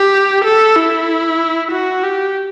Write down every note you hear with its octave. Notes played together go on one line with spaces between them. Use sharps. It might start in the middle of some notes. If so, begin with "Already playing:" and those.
Already playing: G4
A4
E4
F#4
G4